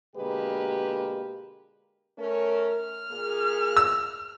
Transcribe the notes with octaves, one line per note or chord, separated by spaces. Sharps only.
B2 D3 G#3 A#3 G4 B4
A3 C#4 A#4
F6
A#2 A#3 G#4
E6